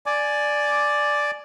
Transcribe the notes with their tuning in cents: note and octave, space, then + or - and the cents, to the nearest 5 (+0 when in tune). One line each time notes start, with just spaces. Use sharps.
D5 +0 G#5 +15 D6 +0